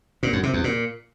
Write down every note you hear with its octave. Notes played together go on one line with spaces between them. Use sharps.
A#2
F#2
C3
E2
A#2